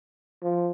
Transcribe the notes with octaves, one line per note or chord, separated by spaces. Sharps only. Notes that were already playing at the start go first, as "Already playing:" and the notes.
F3